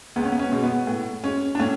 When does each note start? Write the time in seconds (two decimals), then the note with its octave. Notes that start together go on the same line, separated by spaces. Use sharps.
0.16 C#2 B3
0.24 C#4
0.32 B3
0.39 C#4
0.52 B2 G#3
0.63 B3
0.87 A2
1.24 G#3 C#4
1.55 D4
1.59 A2 C#4